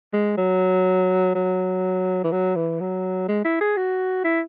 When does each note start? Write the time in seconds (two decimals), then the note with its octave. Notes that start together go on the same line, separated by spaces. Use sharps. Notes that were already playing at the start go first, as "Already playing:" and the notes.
0.13 G#3
0.38 F#3
1.35 F#3
2.24 E3
2.32 F#3
2.56 E3
2.80 F#3
3.28 G#3
3.45 E4
3.61 G#4
3.77 F#4
4.24 E4